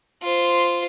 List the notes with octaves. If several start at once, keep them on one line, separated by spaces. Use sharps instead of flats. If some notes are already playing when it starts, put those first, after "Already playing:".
F4 C5